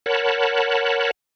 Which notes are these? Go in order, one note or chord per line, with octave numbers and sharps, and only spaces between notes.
A#4 C#5 F#5 A5 B5